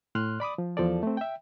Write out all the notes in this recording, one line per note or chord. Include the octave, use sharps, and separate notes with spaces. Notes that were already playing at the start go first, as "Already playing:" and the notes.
A2 C6 F6 F#6
D5 B5 D6 D#6
F3
E2 F3 A4 D5
A3 C4
E5 G5